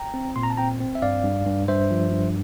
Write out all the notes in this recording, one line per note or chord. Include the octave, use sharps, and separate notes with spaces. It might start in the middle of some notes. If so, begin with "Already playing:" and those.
Already playing: G5 A#5
C4
A#2 C6
A#5
A5
C4 G5 A#5
C4
E5
G2 D5 F5
G2
G2
G2 C5 E5
F3
G2